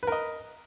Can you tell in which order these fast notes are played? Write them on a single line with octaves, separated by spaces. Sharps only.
B4 A#4 D#5